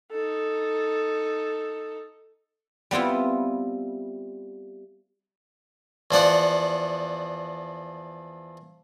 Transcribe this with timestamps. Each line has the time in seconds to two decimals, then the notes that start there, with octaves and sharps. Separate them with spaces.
0.11 D#4 A4
2.91 G3 B3 C4 E4 F4
6.11 E2 F3 D5 F#5